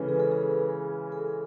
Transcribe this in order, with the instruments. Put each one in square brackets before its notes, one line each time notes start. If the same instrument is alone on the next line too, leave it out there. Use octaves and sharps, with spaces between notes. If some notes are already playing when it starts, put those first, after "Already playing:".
Already playing: [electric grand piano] C#3 E3 G#3 C#4 [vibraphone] A4 B4
[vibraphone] G#4
A4
G#4
A4